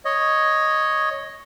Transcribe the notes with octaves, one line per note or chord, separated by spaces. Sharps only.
C#5 D#5